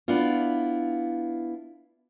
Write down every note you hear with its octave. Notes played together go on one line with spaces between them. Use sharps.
B3 D4 E4 F4